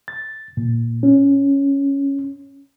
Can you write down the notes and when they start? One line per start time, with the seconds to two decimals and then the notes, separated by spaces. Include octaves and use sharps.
0.08 A6
0.57 A#2
1.03 C#4